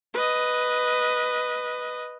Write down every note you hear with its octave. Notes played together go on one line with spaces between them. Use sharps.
B4 D#5